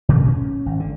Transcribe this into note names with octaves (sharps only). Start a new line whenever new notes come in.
A#2
C#4
G#1
D3